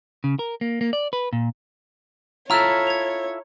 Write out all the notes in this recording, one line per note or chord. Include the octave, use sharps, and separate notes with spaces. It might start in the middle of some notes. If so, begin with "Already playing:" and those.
C#3
A#4
A#3
A#3
D5
B4
A#2
E4 F4 A4 C#5 A#5 E6 F6
G#6 F7